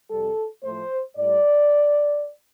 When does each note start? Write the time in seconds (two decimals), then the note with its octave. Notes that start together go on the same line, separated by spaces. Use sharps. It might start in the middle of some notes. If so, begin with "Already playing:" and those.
0.10 F2 C3 G3 A4
0.63 A2 F3 A3 C5
1.17 A2 G3 D5